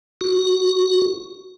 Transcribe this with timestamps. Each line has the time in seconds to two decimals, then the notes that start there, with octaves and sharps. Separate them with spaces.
0.21 F#4